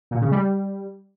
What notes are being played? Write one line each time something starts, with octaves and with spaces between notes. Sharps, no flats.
A#2
C#3
G3